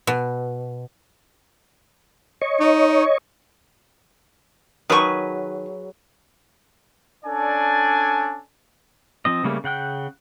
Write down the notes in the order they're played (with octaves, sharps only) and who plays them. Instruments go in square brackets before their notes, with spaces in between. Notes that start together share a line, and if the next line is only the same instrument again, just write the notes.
[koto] B2
[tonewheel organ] C#5 D#5 C#6
[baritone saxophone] D#4
[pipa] D#3 C#6 [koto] F#3 G#4 B4
[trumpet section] C#4 D4 A4 D5 G#5
[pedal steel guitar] F3 C4 D#5
C#3 G3 A3 A#3 C#4
C#3 F#5 G5 F#6